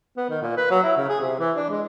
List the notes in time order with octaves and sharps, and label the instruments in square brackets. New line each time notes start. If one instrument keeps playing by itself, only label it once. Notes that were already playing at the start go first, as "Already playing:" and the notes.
[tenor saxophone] B3
D#3
A#2
B4
F#3
E4
C#3
G#4
C3
E3
D4
G#3